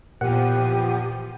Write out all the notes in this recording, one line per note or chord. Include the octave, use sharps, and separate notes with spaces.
E2 A#2 F3 G4 F#5 D#7